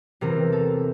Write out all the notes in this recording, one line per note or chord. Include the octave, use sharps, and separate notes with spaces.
E2 C3 E3 A#4
A4